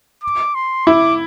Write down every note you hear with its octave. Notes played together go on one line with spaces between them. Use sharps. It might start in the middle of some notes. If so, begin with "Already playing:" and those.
D6
C6
E4 D6